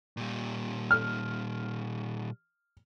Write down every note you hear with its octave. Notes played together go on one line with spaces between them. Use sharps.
A#2 G3
F6